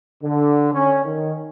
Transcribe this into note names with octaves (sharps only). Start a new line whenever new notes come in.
D3
C#4
D#3